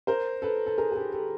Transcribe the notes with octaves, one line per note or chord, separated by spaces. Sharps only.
A#4 C5
A4 B4
A4
G#4 A#4
G#4
G4 A4
G4 A4